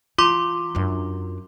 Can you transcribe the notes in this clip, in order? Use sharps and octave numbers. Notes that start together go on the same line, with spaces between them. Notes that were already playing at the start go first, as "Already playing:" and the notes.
E3 F4 C6 D6
F#2 D4